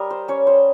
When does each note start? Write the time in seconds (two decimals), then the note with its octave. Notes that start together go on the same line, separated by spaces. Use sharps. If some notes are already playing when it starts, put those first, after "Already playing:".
Already playing: G3 A#4 D#5
0.10 C5
0.28 C#4 C#5
0.47 C5